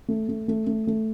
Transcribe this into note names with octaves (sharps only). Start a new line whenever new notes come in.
A3
A3
A3
A3
A3